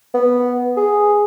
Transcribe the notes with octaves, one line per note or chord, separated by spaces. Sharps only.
B3
G#4